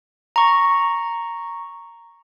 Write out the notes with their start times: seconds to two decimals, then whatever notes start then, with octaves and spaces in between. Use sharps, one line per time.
0.36 A#5 C#6